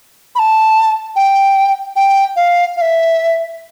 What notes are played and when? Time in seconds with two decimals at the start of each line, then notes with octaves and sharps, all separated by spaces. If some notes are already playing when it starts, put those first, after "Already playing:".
0.35 B5
0.39 A5
1.16 G5
1.96 G5
2.36 F5
2.77 F5
2.81 E5